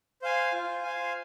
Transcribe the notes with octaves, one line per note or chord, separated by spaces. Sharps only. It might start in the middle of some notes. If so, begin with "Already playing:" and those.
C5 F5 G#5
F4
C5 F5 G#5